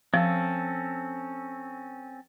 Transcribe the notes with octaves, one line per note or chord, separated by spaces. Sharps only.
F3 C4 C#4 A4